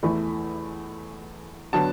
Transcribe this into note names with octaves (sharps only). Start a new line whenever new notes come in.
E2 E3 A3 B5
D3 F#3 B3 A5